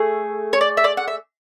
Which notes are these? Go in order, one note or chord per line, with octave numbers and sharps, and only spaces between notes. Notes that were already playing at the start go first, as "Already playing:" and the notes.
Already playing: A3 G#4
C#5
D5
E5
D5
F#5
E5